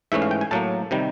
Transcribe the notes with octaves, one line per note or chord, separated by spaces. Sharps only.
G#2 E3 A3 C#4 E5
F5
G5
G#5
A2 F#3 A#3 A5
C3 D#3 G3